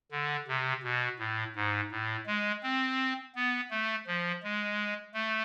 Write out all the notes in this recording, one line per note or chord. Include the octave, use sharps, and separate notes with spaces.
D3
C3
B2
A2
G#2
A2
G#3
C4
B3
A3
F3
G#3
A3